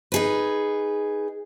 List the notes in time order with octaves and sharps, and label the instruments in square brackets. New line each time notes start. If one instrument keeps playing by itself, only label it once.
[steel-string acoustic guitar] D#4 G#4 B4